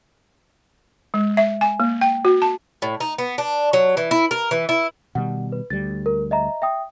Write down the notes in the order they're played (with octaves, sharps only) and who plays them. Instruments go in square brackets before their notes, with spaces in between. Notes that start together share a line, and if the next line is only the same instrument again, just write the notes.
[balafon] G#3
E5
G#5
A#3
G5
F#4
A5
[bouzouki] A2
D#4
B3
D4
F#3
E3
E4
A#4
E3
E4
[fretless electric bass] B2 D#3 G3 [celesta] F#5
[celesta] B4
[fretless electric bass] D2 G3 [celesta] A6
[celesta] A#4
D#5 E5 A#5
E5 G5 D#6